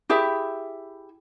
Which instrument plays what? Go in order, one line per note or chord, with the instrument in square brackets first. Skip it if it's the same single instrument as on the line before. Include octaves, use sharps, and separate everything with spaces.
[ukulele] E4 G4 G#4 E5